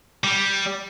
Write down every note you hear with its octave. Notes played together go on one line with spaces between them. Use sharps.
G3